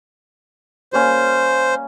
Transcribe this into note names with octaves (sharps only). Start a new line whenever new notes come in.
G3 A#3 C#4 C5